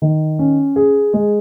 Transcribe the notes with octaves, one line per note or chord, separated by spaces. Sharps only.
D#3
C#4
G#4
G#3